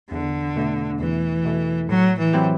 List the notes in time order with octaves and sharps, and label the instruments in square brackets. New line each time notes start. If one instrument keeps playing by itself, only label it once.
[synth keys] E2 [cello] D3
[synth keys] B2 A3
[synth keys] E2 [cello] E3
[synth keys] B2 A3
[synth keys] A2 [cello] F#3
[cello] E3
[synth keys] F#3 C4 E4 G4